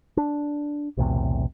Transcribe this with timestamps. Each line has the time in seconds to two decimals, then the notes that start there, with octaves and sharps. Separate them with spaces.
0.17 D4
0.97 B1 E2 A2 C3